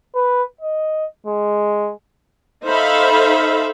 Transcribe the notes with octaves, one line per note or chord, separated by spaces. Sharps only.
B4
D#5
G#3
D#4 A4 C5 E5 F5 B5